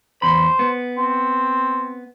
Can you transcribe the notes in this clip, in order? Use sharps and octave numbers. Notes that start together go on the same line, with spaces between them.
E2 C5 B5
B3
C4